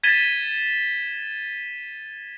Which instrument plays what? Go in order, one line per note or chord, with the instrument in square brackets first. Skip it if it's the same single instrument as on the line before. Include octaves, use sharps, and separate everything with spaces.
[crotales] G#6 A6 B6 D#7 E7 G7